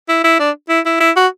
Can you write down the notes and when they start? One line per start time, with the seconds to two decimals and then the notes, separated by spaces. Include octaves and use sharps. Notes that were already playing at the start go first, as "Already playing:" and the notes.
0.09 E4
0.24 E4
0.39 D4
0.69 E4
0.86 E4
1.00 E4
1.16 F#4